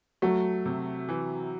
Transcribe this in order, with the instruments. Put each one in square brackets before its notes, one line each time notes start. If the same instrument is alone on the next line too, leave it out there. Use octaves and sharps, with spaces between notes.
[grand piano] F#3 [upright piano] A3
[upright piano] C3
E3